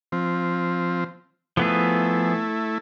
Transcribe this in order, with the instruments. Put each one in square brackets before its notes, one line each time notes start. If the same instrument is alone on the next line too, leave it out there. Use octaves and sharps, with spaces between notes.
[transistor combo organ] F3 C4
[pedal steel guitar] F3 B3 G#4 [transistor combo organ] A3 E4